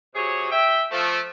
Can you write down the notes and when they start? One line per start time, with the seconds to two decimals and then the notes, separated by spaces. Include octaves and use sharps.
0.15 C3 F#3 G#4 C#5
0.51 E5 G5
0.92 F3 A3